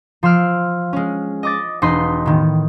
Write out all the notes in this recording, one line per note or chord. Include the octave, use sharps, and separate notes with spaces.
F3 C6 E6 F6 D7
G#3 C#4
D#5 D6 A6
E1 D#4 B4 D#5 C6 B6
A2 D#3 B3